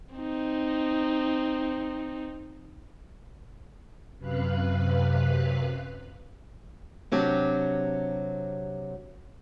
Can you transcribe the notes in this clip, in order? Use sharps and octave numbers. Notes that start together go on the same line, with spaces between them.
C4 D#4
F#2 C3 B4 F5 F#6
C3 F#3 D4 G4